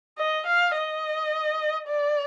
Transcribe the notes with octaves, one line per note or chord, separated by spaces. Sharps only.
D#5
F5
D#5
D5